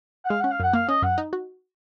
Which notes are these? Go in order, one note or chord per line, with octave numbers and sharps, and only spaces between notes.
F#5
G#3 F5
C#4 F#5
F5
F#2 F#5
A#3 F5
C#4 D#5
F#2 F#5
D#4
F#4